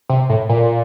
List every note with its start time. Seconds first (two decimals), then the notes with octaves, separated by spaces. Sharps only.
0.09 C3
0.30 A2
0.49 A#2